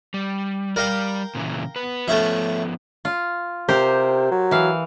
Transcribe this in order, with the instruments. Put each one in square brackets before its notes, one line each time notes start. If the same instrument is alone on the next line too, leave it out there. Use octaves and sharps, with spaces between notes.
[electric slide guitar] G3
[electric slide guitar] G3 D5 [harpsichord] A#4 F5 G5
[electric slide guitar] A#2 C#3 E3
B3 B4
[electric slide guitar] F3 B3 [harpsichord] A3 C#4 E5
[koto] F4
[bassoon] C3 [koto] G4 A#4 C5
[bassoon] F#3
[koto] E3 F5